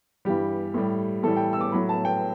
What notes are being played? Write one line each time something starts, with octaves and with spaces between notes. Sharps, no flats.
G2 E3 G3 G4
A2 G3
A2 E3 G3 A4
G5
E6
D6
A2 F#3 B5
A5
G5